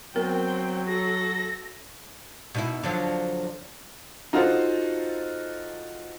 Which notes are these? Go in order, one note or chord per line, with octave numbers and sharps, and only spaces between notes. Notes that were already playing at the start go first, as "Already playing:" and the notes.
F#3 B3 C4 A#4 G5
F#4 A4 A#6
B2 D#4 E4
D3 F3 F#3
D#4 F4 F#4 A4 C5